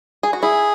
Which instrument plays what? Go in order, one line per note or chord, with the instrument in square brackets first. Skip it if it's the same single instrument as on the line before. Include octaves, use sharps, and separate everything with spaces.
[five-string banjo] G#4
F#4
[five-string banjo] E4 [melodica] G#4